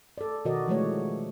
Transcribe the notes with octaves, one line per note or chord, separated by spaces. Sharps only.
A4 D5
B2 D#3 F#4 A#4 D5 D#5
E3 F3 G#3 A3 B4 C#5